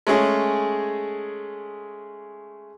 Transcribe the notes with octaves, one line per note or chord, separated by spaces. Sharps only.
G#3 A3 C#4 G#4